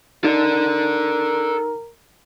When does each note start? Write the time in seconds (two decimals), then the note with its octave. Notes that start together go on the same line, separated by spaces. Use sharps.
0.24 D#4 A4 A#4 D5